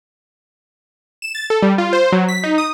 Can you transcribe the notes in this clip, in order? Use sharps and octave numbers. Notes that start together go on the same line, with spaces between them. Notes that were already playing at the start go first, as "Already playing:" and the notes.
E7
A6
A4
G3
F4
C5
F#3
B6
D#4
D#6